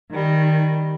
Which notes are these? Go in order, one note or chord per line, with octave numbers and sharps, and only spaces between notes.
D#3 G3